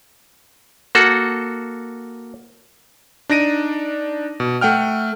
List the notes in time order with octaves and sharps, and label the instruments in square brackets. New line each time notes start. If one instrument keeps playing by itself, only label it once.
[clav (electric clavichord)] A#3 F#4 A4
[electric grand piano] D4 D#4 A#6 D7 D#7
B2
A3 F#5 G5 F6